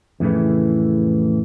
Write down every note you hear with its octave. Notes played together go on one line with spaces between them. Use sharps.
F2 A2 C#3 E3